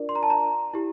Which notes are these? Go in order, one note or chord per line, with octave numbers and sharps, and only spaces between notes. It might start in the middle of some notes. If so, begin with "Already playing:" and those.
Already playing: D4 F4 A#4 D5
C6
A#5
A5
A#5
E4 G4